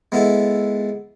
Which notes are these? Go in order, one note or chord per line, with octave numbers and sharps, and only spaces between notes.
G#3 B3 E4 A4